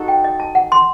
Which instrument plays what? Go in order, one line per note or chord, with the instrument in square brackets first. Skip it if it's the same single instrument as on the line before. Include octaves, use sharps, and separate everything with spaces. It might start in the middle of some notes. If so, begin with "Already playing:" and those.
Already playing: [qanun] D#4 F#4 A4
[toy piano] G5
D#5
A5
F#5
C6